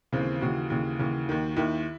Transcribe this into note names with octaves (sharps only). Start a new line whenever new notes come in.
D#2 C#3 E3 C4
D#2 C#3 E3 F#4
D#2 C#3 E3
D#2 C#3 E3
D#2 D#3
D#2 D#3 E4